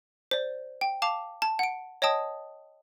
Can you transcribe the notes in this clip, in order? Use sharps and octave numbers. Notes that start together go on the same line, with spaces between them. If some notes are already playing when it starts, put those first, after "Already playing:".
C5 D5
G5
F5 A5 D6 F7
A5
F#5 D7
C#5 D#5 G5 A5 D#6